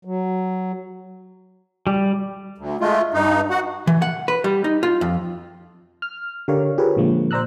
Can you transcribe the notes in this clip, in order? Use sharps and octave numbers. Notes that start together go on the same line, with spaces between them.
F#3
G3
D2
G#3 A3 F4
G2 D#4
F#4 F#5
E3
F#5
B4
G3
D#4
F4
F2
F6
D3 G4 A#4 C#5 D5 F5
F4 G4 G#4 A#4 B4 C#5
A#2 D3 F3 G#3 A#3
C5 D5 A#5 E6 F#6